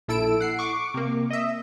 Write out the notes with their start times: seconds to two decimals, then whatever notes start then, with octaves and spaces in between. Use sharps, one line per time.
0.08 A#1 E4 A4 E6 D7
0.40 F#5 C7
0.59 C#6 D6
0.94 C3 A#3
1.30 D#5 E5